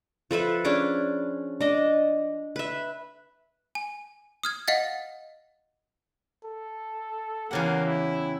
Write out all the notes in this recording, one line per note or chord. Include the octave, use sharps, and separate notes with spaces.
F3 A4 B4 E5
C#4 D4 G#4 D6
D4 D#5
B4 E5
G#5
D#6 F6 G#6
D#5 F5 F#5 A6
A4
E2 C#3 A#3 G4 F#5
E4